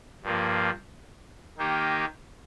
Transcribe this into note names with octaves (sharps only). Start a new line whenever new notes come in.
G2 F3 A#3
D#3 A#3 D#4 G4